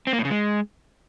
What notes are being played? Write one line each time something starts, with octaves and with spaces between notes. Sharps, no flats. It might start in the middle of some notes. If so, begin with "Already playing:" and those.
C4
A#3
A2
C#3
G#3